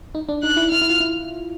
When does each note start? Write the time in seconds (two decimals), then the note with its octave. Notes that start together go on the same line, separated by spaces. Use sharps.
0.15 D#4
0.29 D4
0.43 D#4 F#6
0.56 E4
0.71 E4 F6
0.82 E4
0.90 F4
1.00 E4